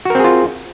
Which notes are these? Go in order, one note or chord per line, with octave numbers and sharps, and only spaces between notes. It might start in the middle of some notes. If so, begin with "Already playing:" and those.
C4 F4 F#4 G#4 A#4